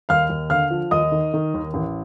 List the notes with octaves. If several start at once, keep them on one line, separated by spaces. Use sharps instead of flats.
D#2 F5 F6
D#2
D3 F5 F6
F3
D#2 D#5 D#6
D#3
D#3
D#2
A1